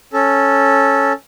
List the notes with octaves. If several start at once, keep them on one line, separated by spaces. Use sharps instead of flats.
C#4 A4